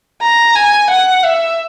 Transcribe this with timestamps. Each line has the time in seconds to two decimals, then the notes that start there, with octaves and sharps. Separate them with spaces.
0.22 A#5
0.55 G#5
0.90 F#5
1.24 E5